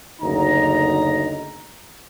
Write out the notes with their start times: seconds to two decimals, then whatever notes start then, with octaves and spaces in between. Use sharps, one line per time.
0.22 F#1 D2 D#4 A#5